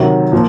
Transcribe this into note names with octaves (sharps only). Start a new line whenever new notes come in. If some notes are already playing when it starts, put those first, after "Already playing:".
Already playing: C3 D#3 F#3
A#2 F3